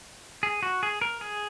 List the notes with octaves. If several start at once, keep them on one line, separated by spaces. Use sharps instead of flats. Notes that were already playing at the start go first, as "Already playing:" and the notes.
G#4
F#4
G#4
A#4
G#4